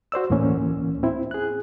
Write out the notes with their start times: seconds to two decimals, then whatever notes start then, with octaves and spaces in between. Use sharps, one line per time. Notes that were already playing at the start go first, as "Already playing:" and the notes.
0.12 F#4 C5 D5 E6
0.30 D2 A2 E3 A#3 C#4
1.03 C4 E4
1.31 G#4 F#6